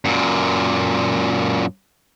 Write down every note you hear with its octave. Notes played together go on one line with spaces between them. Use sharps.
F#2 A#2